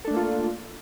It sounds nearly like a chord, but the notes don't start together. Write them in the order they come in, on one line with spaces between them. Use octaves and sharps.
A4 D4 A3 A#3 F4